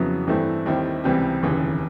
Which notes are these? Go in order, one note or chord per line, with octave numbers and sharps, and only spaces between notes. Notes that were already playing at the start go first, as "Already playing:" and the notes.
Already playing: F2 C#3 F#3 B3 E4
G2 E3 A3 C4 E4
D#2 D#3 G3 C4 E4
C#2 C3 E3 G3 C4
F1 D#2 C#3 E3